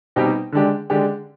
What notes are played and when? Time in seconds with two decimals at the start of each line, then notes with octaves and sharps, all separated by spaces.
0.16 B2 G3 C4 D#4 G4
0.52 D3 G#3 D4 G4
0.90 D3 G#3 D4 G4